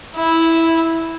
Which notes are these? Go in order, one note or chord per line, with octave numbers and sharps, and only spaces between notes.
E4